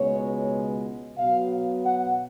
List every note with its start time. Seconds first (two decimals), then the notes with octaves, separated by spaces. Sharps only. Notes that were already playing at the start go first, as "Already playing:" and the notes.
Already playing: C#2 B2 G#3 B3 C#5
1.18 B2 F#3 B3 F5
1.84 F#5